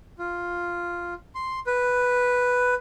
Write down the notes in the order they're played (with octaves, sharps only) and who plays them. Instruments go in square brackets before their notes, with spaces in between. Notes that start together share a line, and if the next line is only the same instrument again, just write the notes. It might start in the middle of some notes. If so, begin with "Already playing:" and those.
[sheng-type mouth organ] F4
C6
B4